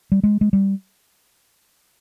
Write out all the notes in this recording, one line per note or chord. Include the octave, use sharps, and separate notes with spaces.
G3
G#3
G#3
G3